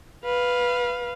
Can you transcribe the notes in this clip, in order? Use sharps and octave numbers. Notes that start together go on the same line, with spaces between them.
B4 F5